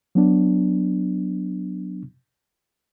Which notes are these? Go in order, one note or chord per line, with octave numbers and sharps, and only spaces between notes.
F#3 B3 D4